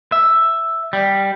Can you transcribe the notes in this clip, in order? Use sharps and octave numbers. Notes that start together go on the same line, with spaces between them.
E5
G3